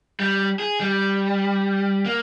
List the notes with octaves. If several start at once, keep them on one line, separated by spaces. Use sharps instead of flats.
G3
G#4
G3
A#3